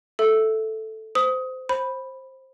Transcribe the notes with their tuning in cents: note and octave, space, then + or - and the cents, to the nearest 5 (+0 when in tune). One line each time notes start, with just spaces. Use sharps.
A4 +0 E5 +0
C5 -20 D#6 +20
C5 +15 B5 +0